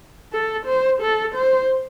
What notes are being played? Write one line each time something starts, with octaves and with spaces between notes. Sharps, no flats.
A4
C5
A4
C5